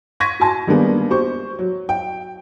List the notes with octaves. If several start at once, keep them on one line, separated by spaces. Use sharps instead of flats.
C6 C#6 G#6 A#6 B6 D#7
F#4 G#5 A5 C6
D#3 G3 G#3 A#3 B3 D4
G4 C5 C#6
F#3
G5